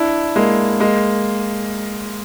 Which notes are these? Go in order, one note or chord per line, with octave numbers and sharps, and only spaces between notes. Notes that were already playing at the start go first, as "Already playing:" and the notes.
Already playing: D4 E4
G#3 A#3
G#3 A#3